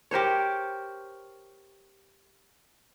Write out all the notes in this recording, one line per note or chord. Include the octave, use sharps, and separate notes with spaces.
G4 A#4 C5 C#5